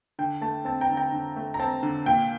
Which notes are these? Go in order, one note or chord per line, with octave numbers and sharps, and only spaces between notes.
D3 G5
A3 A5
C4 A5
G5 A#5
D3
G5 A#5
D3
A3
A#5
C4 A5
D3
A#2 G5